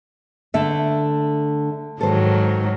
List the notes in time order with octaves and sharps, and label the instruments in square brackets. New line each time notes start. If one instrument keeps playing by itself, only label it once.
[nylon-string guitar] D3 A3 E5
[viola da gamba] G#2 D#3 F#3 [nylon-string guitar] A4 C5